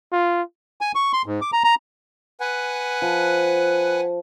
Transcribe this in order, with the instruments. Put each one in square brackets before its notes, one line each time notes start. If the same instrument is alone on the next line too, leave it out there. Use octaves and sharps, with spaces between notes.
[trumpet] F4
[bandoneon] G#5
C#6
C6
G#2
D6
A#5
A#5
[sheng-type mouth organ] B4 F#5 G#5
[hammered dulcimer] F3